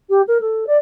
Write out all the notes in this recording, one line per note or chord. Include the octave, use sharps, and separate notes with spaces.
G4
A#4
A4
D5